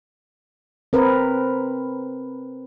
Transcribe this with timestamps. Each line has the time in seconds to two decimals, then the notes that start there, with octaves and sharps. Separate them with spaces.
0.93 C4 A#4 B4